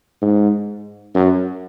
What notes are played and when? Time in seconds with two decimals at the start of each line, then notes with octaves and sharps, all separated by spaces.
0.22 G#2
1.15 F#2